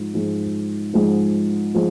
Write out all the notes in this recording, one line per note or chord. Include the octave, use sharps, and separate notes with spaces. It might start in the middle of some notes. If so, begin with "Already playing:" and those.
Already playing: G#2 F3 G#3
G#2 F3 G#3
G#2 F3 G#3
F3 G#3